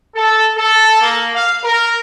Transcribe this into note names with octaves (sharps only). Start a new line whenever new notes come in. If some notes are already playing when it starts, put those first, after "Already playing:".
A4
A4
A#3
F5
A#4